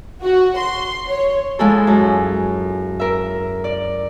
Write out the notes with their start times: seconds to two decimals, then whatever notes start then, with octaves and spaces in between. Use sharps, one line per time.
0.22 F#4
0.57 C6
1.09 C#5
1.59 F3 G#3 E4 G#4 A4
1.87 F#2
3.00 A#4 E5
3.64 D5